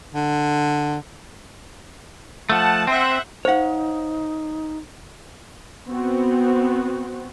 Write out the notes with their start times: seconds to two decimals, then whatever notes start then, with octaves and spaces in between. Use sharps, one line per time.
0.14 D3
2.50 F3 A3 F#5 A5
2.87 C4 C5 E5 F#5
3.45 D#4 C5 C#5 F5 F#5
5.87 B3 C4 F#4